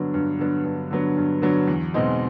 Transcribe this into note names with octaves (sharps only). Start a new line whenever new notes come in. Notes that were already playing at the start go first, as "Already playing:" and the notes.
Already playing: G2 D3 F#3 B3 D4
G2
D3 F#3 B3 D4
G2
D3 F#3 B3 D4
G2
D3 F#3 B3 D4
E2
B2 G#3 C4 D#4